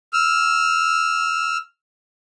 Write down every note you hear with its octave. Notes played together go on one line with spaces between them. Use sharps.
E6 F6